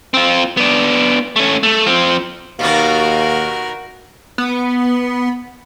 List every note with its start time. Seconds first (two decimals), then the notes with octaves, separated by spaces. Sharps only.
0.14 C4 F4
0.57 B3 D4
1.36 A3 C#4
1.63 A3
1.86 F3 C4
2.59 D#2 B2 D#3 A#3 F#4 A#4 F5
4.38 B3